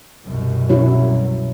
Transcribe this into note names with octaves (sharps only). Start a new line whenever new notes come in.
C2 F#2 B2
F#3 C#4 E4